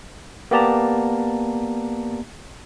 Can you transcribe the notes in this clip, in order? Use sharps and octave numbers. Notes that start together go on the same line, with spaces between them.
A#3 B3 G4 D5 A5 A#5